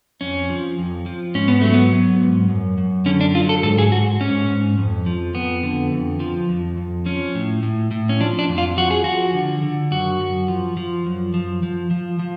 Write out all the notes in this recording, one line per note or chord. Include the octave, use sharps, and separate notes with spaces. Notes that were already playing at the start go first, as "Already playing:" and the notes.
F2 C#4
F3
F2
F3
G#2 C#4
B3
F#3 A3
B3
F#3
G#2
F#2
F#2
D3 C#4
D4
F#3 F4
A4
G#2 A4
G#4
G#2 F#4
G#2 C#4
G#2
F2
F3
F2 B3
D3
F2
F3
F2
F2
F3 C#4
A2
A2
A2
C#4
F3 D4
D4
F2
F4
F3 F#4
G#4
F3 F#4
D3
D3
F#2 F#4
F#2
F3
F3
F#2
F3
F3
F3
F3